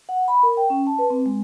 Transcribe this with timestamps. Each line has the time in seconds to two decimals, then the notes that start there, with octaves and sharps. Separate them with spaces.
0.09 F#5
0.28 B5
0.43 A#4
0.57 G5
0.70 C#4
0.87 A5
0.99 B4
1.10 C4
1.26 G#3